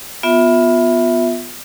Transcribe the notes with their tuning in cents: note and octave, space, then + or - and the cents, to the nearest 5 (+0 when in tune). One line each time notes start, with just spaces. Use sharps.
B3 +0 F4 +20 E5 +0